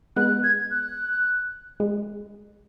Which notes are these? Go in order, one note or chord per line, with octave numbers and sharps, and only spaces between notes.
G#3 B3 F#6
G#6
F#6
G#3